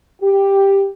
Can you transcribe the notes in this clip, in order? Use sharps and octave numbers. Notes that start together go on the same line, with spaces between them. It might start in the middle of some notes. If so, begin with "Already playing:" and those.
G4